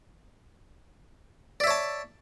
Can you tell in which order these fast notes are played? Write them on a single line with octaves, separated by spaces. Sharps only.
D5 E5 C#5 A5